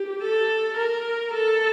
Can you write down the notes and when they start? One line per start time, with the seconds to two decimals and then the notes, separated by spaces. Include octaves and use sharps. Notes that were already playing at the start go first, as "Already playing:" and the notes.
Already playing: G4
0.22 A4
0.77 A#4
1.34 A4